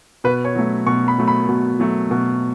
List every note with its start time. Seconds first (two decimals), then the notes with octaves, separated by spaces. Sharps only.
0.24 B2 B4
0.45 C#5
0.55 F#3 A3
0.87 B2 C#6
1.08 B5
1.18 F#3 A3
1.28 B5
1.49 B2
1.80 F#3 A3
2.11 B2